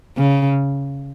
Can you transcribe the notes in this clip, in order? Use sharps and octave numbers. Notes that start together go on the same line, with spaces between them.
C#3